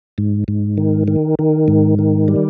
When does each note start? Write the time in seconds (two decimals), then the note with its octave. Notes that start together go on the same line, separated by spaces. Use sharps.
0.18 G#2
0.48 G#2
0.78 D#3
1.08 D#3
1.39 D#3
1.68 G#2
1.99 D#3
2.28 G3